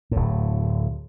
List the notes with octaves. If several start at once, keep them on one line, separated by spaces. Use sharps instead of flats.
D1 A2